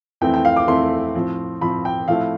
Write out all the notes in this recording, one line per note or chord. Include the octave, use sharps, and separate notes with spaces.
F2 E3 A3 C4 E4 G5
G5
F5
D6
F2 E3 A3 C4 E4 C6
A2 F3 C4
A2 F3 C4 B5
G5
A2 F3 A3 C4 E4 F5